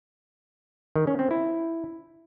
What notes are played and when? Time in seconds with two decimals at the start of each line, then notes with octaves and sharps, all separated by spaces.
0.96 D#3
1.07 C#4
1.19 C4
1.31 E4